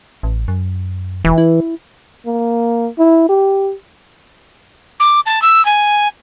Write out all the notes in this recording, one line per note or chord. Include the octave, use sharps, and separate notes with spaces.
A1
F#2
E1 E3
E4
A#3
E4
G4
D6
A5
E6
G#5